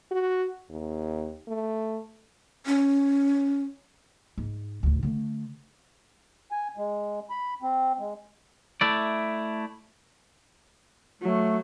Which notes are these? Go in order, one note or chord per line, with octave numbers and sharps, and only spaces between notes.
F#4
D#2
A3
C#4
G#2
A1 D2
D3 A3
G#5
G#3
B5
C4
G#3
A3 E4 D5
F#3 A3